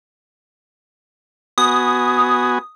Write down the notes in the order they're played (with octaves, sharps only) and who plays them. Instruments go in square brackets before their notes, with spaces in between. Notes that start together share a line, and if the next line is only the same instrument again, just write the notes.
[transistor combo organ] B3 F#4 G#5 [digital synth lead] D#6